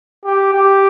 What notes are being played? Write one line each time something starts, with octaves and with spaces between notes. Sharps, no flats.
G4
G4